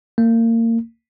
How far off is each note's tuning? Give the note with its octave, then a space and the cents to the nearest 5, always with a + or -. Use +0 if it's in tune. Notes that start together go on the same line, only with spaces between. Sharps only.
A#3 -30